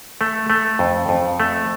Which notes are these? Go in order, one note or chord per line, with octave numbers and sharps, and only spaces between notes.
A3
A3
F2
F2
A3